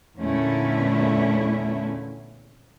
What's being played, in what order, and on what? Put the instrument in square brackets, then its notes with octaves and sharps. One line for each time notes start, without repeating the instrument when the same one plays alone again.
[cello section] E2 A#2 D3 A3 C#4 E4